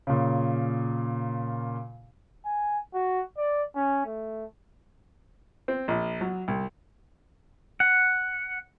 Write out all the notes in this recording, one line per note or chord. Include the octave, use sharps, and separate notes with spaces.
A#2 C#3
G#5
F#4
D5
C#4
A3
C4
A#1
F#3
C2
F#5